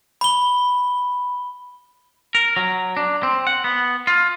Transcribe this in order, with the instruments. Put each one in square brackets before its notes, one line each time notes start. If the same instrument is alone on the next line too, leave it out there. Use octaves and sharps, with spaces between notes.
[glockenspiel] B5 G7
[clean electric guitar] A#4
F#3
D4
C4
F#5
B3
F4